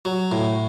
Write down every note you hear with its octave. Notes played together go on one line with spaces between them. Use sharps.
F#3
A2